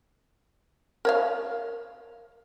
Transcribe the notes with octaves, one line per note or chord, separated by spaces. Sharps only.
A#4 C#5 F5